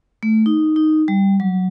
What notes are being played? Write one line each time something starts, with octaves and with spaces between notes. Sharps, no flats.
A3
D#4
D#4
G3
F#3